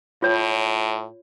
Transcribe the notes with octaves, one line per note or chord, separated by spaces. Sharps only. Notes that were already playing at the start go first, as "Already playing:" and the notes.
A2 F4 C#5